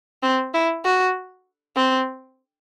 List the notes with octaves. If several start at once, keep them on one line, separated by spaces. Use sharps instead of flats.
C4
E4
F#4
C4